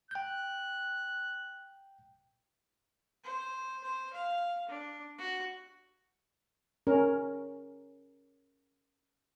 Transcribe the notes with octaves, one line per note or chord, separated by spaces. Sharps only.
G5 F#6 G6
C5
C5
F5
D4
F#4
C#4 A#4